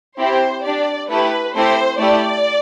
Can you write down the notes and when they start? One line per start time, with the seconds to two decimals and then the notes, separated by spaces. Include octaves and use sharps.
0.19 C4 E4 G4 C5
0.64 D4 G4 D5
1.09 A3 E4 G4 B4
1.54 A3 C4 E4 G4 C5
1.99 A3 E4 G4 D5